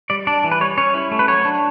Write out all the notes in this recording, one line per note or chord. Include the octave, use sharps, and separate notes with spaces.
G3 D5
D4 D5
E3
B4
G3 C#5
C#4 C#5
E4
A3
B4
F#3 C#5
D4